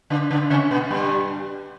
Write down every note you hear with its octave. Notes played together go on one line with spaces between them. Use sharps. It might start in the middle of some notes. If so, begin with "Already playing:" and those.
D3 D4
D3 D4
C#3 C#4
B2 B3
G2 G3